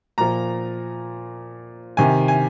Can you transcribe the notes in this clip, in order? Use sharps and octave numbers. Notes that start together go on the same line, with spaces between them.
A#2 F3 A#5
C3 D#3 G#5
G#5